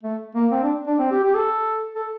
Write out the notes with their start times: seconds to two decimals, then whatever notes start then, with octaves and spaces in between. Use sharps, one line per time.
0.03 A3
0.35 A#3
0.51 C4
0.63 D4
0.87 D4
0.99 C4
1.11 G4
1.23 G4
1.35 A4
1.95 A4